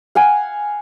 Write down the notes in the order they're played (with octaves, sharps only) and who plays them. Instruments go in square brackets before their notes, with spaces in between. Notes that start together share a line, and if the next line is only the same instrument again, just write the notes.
[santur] F5 F#5 G#5